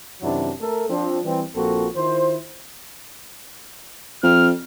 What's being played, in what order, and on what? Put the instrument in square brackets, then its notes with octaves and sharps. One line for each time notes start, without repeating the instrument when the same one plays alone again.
[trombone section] F#2 C3 D#3 F#3 D4 E4
A3 A4 A#4
F3 C4 D4
E3 G3 C4
A#1 F3 A#3 C4 F#4 A4
D#3 E4 F4 C5
[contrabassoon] F2 [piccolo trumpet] F6